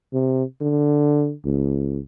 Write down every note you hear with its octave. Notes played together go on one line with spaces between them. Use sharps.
C3
D3
C#2